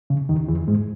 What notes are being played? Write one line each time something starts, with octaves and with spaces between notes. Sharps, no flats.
C#3
D#2 D#3
E2 E3
G#2 G#3